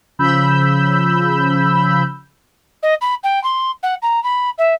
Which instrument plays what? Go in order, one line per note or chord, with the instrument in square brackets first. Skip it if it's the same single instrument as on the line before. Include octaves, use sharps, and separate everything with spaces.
[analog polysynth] C#3 F3 B5 E6 G6
[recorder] D#5
B5
G5
C6
F#5
A#5
B5
E5